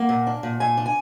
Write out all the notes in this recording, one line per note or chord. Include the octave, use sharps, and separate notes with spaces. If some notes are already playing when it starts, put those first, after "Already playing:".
Already playing: A#3 F#5
A#2
D4
A#2
A#2 G#5
D4
G#5